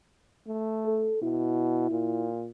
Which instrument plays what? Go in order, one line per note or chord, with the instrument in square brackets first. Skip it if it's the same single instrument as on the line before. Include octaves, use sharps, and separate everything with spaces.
[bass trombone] A3
[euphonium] A4
[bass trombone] B2 [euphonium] E4
[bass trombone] A#2